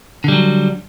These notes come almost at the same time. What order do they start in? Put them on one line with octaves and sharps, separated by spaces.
D3 G3 F#3